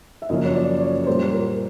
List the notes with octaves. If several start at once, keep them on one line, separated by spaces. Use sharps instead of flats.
E5
F#2 C#3 F3 A#3 C#4 D#5
C#5
D5
D5
C#5
C#5
A#2 G3 A#3 C5
A#4